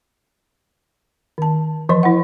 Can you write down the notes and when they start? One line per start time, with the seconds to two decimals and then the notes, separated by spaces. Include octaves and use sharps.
1.38 D#3 A5
1.89 E3 F3 D#5 C6
2.03 E4 F#5